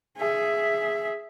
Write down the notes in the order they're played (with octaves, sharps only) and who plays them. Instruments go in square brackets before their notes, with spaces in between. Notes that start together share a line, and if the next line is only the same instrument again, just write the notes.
[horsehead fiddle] G#4 E5